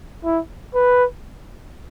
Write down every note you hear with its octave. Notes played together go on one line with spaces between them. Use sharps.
E4
B4